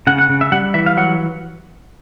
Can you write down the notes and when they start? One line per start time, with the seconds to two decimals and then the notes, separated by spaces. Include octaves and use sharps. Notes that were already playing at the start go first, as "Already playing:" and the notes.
0.07 C#3 F#5
0.19 F#5
0.29 C#3
0.41 E5
0.52 G3 F#5
0.74 E3 E5
0.86 F5
0.97 F#3 F#5